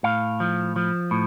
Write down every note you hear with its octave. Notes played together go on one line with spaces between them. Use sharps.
A2 F5
F3
F3
A2